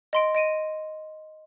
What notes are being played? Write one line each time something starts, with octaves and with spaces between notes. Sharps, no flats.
D#5 C6 D7
D#5 D7 D#7